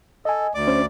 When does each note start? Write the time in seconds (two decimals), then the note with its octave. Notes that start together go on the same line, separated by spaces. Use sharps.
0.25 A4 D#5 G#5
0.55 D2 D5 D6
0.68 C#4 C5